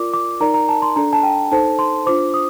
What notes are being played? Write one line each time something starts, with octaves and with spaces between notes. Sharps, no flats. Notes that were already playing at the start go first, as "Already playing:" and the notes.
Already playing: F4 A#4 D5 D6
D6
D#4 A#4 D5 A#5
A#5
A5
C6
D4 A4 D5 A#5
A5
G5
D#4 A4 C5 A5
C6
D4 F4 C5 D6
D#6